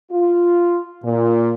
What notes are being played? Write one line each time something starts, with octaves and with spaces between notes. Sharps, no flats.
F4
A#2